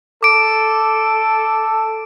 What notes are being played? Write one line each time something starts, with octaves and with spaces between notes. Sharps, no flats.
A4 D6 D7